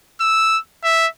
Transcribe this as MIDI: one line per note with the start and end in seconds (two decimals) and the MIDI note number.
0.20 0.59 88
0.84 1.07 76